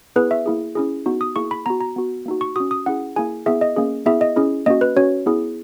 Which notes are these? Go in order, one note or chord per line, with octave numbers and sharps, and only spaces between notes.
B3 E4 G#4 B4
E5
A#3 E4 G#4
C#4 E4 G#4
B3 D#4 F#4
D#6
A#3 E4 G#4 C#6
B5
B3 F#4 A#5
A#5
B3 F#4
A#3 D#4 F#4
C#6
C#4 F#4 D#6
D#6
C#4 E4 G#4 F#5
A#3 E4 G#4 G#5
B3 E4 G#4 E5
D#5
A#3 C#4 G#4
B3 E4 G#4 E5
D#5
C#4 E4 G#4
A#3 C#4 F#4 D#5
B4
C#4 F#4 C#5
B3 E4 G#4